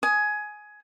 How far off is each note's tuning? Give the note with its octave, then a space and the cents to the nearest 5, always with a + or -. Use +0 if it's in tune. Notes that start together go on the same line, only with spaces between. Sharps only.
G#5 +15 D#6 +5